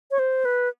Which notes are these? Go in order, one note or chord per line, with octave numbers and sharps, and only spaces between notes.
C#5
C5
B4